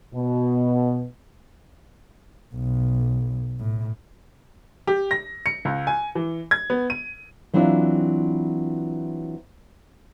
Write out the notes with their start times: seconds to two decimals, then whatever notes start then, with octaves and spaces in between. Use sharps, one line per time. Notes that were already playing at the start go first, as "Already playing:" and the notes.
0.14 B2
2.54 B1
3.60 A2
4.87 G4
5.11 A#6
5.46 C#7
5.65 C#2
5.87 G#5
6.15 E3
6.51 G#6
6.70 B3
6.90 D#7
7.53 E3 F#3 C4 D4 E4 F4